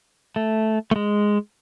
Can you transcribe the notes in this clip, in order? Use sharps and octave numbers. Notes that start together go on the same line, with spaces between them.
A3
A3
G#3